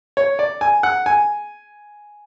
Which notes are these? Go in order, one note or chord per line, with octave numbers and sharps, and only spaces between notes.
C#5
D5
G#5
F#5
G#5